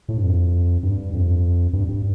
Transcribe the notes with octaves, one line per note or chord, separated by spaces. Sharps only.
A2
G2
F2
G2
F2
G2
G2